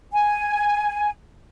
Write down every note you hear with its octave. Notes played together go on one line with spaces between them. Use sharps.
G#5